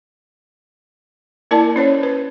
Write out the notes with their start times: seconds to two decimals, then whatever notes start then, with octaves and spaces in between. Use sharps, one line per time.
1.51 A#3 E4 A#4 D5 A5
1.76 C#4 C5 C#5
2.03 B4